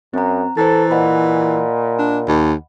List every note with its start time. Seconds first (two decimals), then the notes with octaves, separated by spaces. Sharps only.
0.14 F#2 C4 A#5
0.57 E3 A4 C5 A#5 A6
0.91 A#2 D#5 F#5 B5
1.99 D4
2.28 D#2